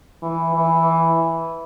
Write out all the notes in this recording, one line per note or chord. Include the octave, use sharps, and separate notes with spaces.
E3
E3